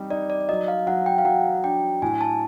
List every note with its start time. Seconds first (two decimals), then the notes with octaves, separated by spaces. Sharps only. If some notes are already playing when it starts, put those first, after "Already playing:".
Already playing: G3 C4 D#4
0.10 D#4 D5
0.30 D5
0.49 F#3 D#5
0.68 F5
0.87 F#3 F#5
1.06 G5
1.18 F5
1.25 F#3 F#5
1.64 D4 G5
2.02 A2 G#5
2.21 A5